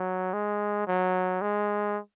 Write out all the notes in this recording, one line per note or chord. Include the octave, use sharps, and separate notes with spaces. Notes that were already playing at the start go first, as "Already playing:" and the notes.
Already playing: F#3
G#3
F#3
G#3